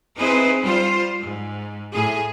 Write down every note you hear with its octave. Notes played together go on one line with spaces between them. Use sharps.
C4 D#4 E4 G#4 B4 C5
G3 F4 C5
G#2
A2 G#4